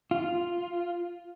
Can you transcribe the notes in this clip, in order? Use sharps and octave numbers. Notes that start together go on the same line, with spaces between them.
F4